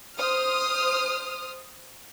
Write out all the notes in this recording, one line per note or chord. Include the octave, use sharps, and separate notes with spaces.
C5 D#6 F6